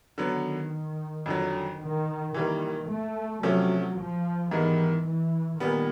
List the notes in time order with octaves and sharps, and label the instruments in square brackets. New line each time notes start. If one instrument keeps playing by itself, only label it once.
[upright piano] D3 F#3 B3 [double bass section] D#3
[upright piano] F2 D3 F#3
[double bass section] D#3
[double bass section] D#3 [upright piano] E3 G3 A#3
[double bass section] A3
[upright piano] C3 F3 A3 C#4 [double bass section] F#3
[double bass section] F3
[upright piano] G#2 D#3 G3 B3 [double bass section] E3
[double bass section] E3
[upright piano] A#2 G3 B3 [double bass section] D#3